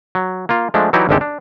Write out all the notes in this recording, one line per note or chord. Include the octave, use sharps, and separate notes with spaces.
F#3
A#3 F4
F3 G#3 A3 D4
E3 F#3 D#4 E4 G4 D5
G#1 D2 D3 G#3 G4 A4
D4